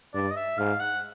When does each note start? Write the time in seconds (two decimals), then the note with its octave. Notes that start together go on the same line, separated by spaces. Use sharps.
0.14 G2 D5
0.31 D#5
0.36 E5
0.58 G#2 F5
0.80 F#5